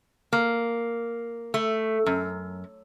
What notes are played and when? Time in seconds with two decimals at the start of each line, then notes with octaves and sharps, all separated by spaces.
0.33 A#3
1.54 A3
2.06 F#2